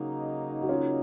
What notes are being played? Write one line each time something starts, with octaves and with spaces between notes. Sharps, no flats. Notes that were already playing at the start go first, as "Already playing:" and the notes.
Already playing: C#3 F#3 A#3 D#4
F#4
C#4 F4